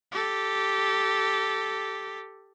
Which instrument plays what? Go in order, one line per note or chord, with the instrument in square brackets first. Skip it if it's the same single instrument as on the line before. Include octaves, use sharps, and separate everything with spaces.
[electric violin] G4 A4